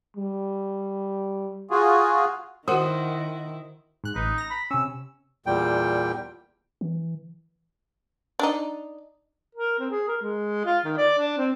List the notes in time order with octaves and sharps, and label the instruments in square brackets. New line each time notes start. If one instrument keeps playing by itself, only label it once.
[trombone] G3
[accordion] F4 F#4 G#4
[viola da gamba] D#3 E4 [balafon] F#4 A#4 [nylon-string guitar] C5 [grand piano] F#5 D#6
[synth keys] G#2 F#6
[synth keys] A1 B4 [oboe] D#4
[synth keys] A#5 A#6
[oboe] B5
[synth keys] C3 C#4 [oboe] E6
[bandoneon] E2 A#2 G3 G5
[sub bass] E3
[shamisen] D4 D#4
[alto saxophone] A#4
C4
G#4
A#4
G#3
F4
D#3
D5
D4
C4